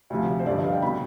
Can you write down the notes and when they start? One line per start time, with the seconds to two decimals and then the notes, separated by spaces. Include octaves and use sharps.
0.10 D2 C3 F3
0.39 C5
0.46 G1 G2 D3 F3 D5
0.55 D#5
0.64 F5
0.73 G5
0.82 B2 B5